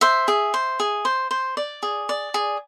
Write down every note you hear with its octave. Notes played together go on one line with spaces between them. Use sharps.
C5 E5
G#4
C5
G#4
C5
C5
D5
G#4
D5
G#4